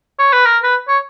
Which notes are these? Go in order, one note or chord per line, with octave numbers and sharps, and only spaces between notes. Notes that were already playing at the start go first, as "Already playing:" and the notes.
C#5
B4
A#4
B4
C#5